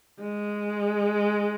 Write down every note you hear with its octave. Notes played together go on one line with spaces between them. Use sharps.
G#3